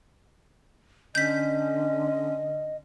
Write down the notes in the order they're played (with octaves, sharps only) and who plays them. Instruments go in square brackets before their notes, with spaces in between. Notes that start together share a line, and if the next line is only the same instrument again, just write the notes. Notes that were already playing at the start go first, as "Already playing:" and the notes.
[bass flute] D3 [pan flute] C#4 [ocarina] D#5 [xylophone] G6 B6